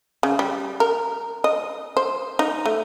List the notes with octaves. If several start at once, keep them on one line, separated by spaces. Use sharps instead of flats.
C#3
G3
A#4
D#5
C5
D#4
A3